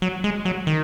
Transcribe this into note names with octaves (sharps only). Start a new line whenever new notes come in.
F#3
G#3
F#3
D#3